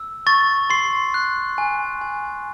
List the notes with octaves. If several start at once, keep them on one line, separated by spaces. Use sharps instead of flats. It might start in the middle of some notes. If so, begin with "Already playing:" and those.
Already playing: E6
C#6 A6
C6 C7
F#6
G#5
G#5